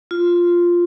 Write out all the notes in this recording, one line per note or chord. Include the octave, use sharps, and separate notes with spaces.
F4